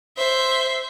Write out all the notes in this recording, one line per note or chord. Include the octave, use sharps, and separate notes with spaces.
C5 E5